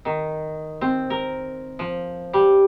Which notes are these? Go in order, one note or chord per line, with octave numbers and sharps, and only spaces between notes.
D#3
C4
A#4
F3
G3